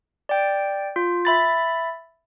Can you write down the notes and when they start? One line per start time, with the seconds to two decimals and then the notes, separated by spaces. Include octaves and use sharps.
0.29 D5 G5
0.96 F4
1.25 E5 B5 A6